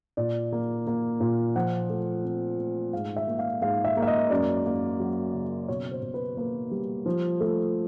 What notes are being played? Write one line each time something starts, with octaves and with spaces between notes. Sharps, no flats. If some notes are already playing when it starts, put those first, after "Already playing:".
A#2 D5
A#3
A#3
A#2
F3 F#5
A3
C4
A3
G#2 F5
E5
A#3
F5
G#2 F5
E5
A#3
E5
D#5
F#2 D5
A#3
F#3
C#3
B2 C#5
C5
B2
B4
A#3 B4
G3
F3
A3